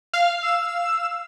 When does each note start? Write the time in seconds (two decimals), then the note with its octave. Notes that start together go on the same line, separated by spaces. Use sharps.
0.14 F5
0.43 E6